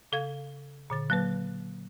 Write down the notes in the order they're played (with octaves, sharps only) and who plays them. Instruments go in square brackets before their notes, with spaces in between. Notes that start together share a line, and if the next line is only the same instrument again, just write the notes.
[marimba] C#3 A4 F5 G#6
A#2 D3 A6
F#3 A#3 B4